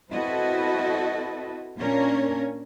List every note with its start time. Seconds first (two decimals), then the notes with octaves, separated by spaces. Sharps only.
0.12 C4 E4 F#4 A4 B4 D#5
1.79 A#2 A#3 C#4 D4 A#4 C#5